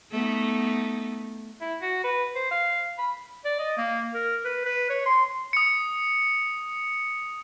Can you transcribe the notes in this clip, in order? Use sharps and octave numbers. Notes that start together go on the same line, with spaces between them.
A3 B3 D#4
E4
F#4
B4
C5
F5
B5
D5
D#5
A#3
A#4
B4
B4
C#5
C6
D#6 C#7